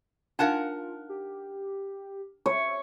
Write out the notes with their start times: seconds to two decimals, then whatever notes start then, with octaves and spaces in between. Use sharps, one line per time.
0.39 D4 D#4 F4 A#4 F5 F#5 A5
1.09 G4
2.46 C#5 E5